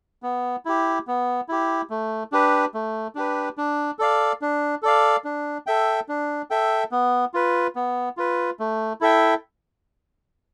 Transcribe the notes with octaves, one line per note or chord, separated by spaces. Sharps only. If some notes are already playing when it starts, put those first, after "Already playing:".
B3
E4 G4
B3
E4 G4
A3
D4 G4 B4
A3
D4 G4 B4
D4
A4 D5 F5
D4
A4 D5 F5
D4
A4 E5 G5
D4
A4 E5 G5
B3
F4 B4
B3
F4 B4
A3
E4 A4 E5 G5